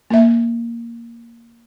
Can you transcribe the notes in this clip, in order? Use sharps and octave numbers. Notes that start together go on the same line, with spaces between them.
A#3 E5